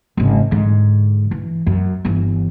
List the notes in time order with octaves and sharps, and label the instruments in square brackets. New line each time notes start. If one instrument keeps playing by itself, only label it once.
[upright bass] G#1 C#3
G#2 D3
E3
F#2
G1 E3